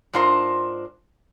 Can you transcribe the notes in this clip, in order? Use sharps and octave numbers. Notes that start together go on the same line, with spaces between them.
G#2 D4 F4 A#4 C5